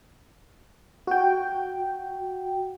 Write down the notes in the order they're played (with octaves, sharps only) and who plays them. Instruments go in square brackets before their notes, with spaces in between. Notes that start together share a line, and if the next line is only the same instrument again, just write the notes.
[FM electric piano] F#4 G5